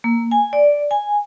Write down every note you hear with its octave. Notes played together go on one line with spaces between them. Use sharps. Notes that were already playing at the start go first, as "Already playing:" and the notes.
A#3
G#5
D5
G#5